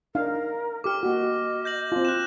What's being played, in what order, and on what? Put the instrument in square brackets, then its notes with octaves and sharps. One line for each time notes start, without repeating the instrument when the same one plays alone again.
[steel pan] D4 D#4 F5 [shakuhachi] A#4
[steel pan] G4 A4 [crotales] D6 F6
[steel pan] A#3 F#4 [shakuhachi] D#5
[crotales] G6 A#6 F#7
[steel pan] C4 F4
[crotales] F#6 E7